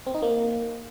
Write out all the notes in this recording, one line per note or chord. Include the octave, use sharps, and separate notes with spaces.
C4
D#4
A#3